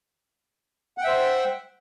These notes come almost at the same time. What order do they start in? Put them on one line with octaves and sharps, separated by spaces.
F#5 G5 E5 C5